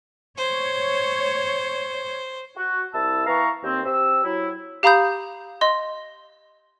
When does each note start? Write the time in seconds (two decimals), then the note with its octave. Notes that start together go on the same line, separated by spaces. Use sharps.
0.37 C5 C#5
2.57 F#4
2.94 C2 E4 A5 E6
3.25 E3 B3 F5 A#5 C#6
3.63 D#2 C4
3.85 C4 G4 E6
4.23 F#3 E4
4.83 G4 F5 A#5 B5 D#6 G6
5.61 D#5 C6